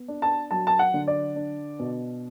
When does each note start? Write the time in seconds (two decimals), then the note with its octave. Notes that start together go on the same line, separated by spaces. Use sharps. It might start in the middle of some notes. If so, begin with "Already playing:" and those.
Already playing: B3
0.08 D4
0.22 A5
0.51 F#3 A5
0.67 A5
0.79 F#5
0.94 D3
1.08 D5
1.36 D4
1.79 B2